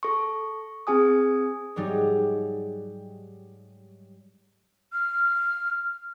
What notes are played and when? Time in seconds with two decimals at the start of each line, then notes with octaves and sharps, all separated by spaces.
0.03 A4 C#6
0.87 C4 G#4 G#5 D#6
1.76 G#2 F#3 G3 D#4
4.93 F6